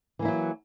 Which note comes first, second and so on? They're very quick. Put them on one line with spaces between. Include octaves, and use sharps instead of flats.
E3 A#3 E4 F#3